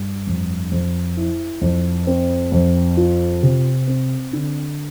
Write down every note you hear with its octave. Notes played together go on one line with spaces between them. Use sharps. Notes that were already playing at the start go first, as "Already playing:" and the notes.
Already playing: G2
F2
F2
E4
F2
C4
F2
F4
C3
C4
D3